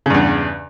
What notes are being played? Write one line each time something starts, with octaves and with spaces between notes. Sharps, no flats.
E2 G2 C#3